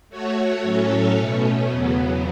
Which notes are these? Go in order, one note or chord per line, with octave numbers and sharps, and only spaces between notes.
A3 F#4 C#5
A2 F#3 C#4 A4 C#5
B2 A3 C#4
E2 C#3 F#3 B3